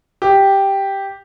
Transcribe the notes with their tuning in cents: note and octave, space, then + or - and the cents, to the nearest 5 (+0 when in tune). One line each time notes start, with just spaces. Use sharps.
G4 +0